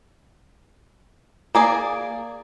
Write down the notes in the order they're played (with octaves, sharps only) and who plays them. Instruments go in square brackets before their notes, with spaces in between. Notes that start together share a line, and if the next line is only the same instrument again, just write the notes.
[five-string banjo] A#3 G#4 D5